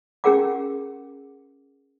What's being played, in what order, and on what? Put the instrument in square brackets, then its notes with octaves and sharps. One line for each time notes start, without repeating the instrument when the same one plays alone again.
[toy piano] C#4 G4 G#4 A#4 F#5 D6